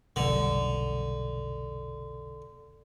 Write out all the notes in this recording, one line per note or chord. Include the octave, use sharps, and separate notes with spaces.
F1 B1 D3 G3